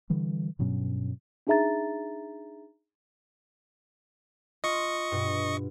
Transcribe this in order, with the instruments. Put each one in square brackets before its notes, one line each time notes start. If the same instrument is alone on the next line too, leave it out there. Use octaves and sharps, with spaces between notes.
[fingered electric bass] D3 E3 G3
G2 B2 F#3 C#4
[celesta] D4 D#4 G#4 E5 A#5 A6
[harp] F4 [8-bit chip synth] D#5 C#6
[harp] G2 B2